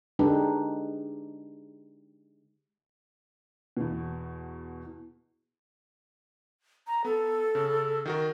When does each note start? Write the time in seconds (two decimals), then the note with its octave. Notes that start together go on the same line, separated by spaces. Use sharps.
0.19 D3 G#3 D4 D#4 G4 B4
3.77 E2 B2
6.87 A#5
7.05 B3 A4
7.55 C#3
8.05 D#3 F#4 A#4